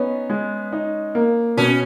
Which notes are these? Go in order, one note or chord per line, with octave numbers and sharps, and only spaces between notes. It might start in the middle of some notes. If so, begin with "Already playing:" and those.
Already playing: B3 C#4 D#4
G#3
D#4
A#3
B2 C#4